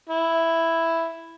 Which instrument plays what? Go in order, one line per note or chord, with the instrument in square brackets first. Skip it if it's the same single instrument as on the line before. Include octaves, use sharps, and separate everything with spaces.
[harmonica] E4